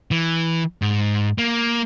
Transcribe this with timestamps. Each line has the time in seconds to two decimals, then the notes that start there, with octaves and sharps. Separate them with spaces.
0.11 E3
0.82 G#2
1.38 A#3